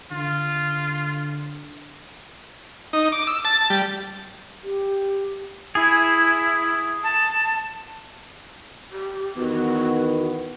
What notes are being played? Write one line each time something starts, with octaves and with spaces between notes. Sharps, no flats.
D3 F4
D#4
D6
E6
A5
G3
G4
E4 G#4
A5
G4
E2 D#3 B3 F#4